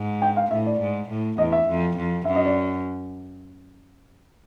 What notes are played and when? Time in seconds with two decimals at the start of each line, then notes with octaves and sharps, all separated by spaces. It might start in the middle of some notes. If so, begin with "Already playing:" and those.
Already playing: G#2
0.22 G5
0.36 F5
0.51 A2 E5
0.66 D5
0.80 G#2
1.09 A2
1.38 E2 D#5
1.52 E5
1.67 F2
1.96 F2
2.25 F#2 E5
2.36 D#5
2.45 D5